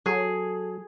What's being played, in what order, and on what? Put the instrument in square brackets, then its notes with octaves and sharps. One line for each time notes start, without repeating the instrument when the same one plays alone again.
[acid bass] F#3 [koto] G#4 [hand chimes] A4